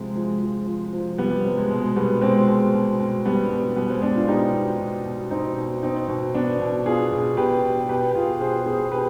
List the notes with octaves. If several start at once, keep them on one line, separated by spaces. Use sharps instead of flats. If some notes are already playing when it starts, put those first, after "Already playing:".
Already playing: C3 F3 G#3
F3 G#3
F3
F3
F3
C3 G3 B3
G3
C3
G#3
B2 G#3
B2 G3 B3
B2 G#3 C4
B2
B2
B2
B2 G3 B3
B2
B2 G3 B3
G#3 C4
B2 B3 D4
D4 F4
B2 D#4 G4
B2
B2
B2
B2 C4 D#4
B2
B2 C4 D#4
B2
B2 B3 D4
B2
B2 F4 G#4
B2
B2 G4 B4
B2
B2 G4 B4
G4
B2 F4 G#4
B2 G#4 C5
B2 G#4 C5
B2 G4 B4